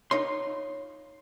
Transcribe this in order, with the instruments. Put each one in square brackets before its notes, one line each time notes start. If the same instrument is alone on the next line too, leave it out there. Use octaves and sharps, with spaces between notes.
[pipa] D#4 F4 [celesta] C#5 [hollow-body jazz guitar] C6